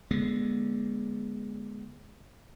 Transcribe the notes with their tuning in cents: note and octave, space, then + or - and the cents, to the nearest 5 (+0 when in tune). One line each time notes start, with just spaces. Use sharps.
D3 +0 G#3 +0 B3 -30